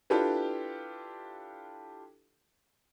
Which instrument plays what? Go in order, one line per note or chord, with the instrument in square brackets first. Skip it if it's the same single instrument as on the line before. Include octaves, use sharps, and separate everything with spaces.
[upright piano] D4 E4 F4 G4 A4 B4